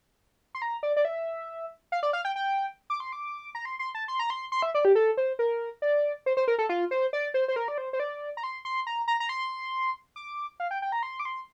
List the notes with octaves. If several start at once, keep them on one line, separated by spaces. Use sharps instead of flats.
C6
A#5
D5
D5
E5
F5
D5
F5
G5
G5
D6
C6
D6
A#5
C6
C6
A5
C6
A#5
C6
C6
E5
D5
G4
A4
C5
A#4
D5
C5
C5
A#4
A4
F4
C5
D5
C5
C5
A#4
D5
C5
C5
D5
A#5
C6
C6
A#5
A#5
A#5
C6
D6
F5
G5
G5
A#5
C6
D6
C6